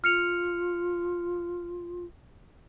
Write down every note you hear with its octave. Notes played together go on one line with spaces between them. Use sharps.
F4 F6 C#7 F7